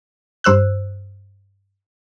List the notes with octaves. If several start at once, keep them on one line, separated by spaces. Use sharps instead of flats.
G2 C5 E6 F#6